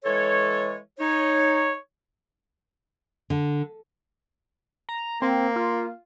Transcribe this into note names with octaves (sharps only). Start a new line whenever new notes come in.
E3 G#3 A4 C#5
D#4 C#5
D3
A#5
A#3 C4
F4